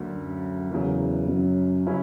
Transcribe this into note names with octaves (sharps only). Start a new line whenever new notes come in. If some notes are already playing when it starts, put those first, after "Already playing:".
Already playing: D2 D3 F#3 A#3
F#2
E2 C#3 F#3 A#3
F#2
C#3 F#3 C#4 E4